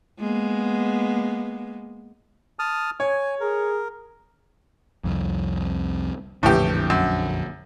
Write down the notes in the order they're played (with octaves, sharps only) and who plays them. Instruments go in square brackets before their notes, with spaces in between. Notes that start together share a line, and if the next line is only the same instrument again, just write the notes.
[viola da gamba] G#3 A#3 B3
[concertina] A5 D#6 F6
[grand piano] C#5 [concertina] G#5
[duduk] G#4 [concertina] A#4
[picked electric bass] C2 F2
[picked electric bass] A#1 F2 D3 [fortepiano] A2 E3 G4
[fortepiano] F#2